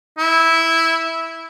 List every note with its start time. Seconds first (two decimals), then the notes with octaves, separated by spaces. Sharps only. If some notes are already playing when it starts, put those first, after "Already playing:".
0.18 E4